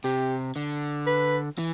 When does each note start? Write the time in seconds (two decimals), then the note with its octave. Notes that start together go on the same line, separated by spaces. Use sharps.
0.04 C3 G4
0.56 D3
1.07 B4
1.58 E3